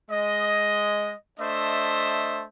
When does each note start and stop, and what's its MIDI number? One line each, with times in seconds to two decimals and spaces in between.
0.10 1.13 56
0.10 1.13 75
1.39 2.44 57
1.39 2.44 62
1.39 2.44 72
1.39 2.44 75
1.39 2.44 76